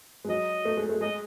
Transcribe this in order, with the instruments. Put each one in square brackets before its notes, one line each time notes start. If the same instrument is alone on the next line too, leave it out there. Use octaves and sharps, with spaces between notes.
[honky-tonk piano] G#3
[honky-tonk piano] F#3 [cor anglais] D#5
[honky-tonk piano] A3
G#3
A3
[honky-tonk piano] G#3 [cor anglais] D#5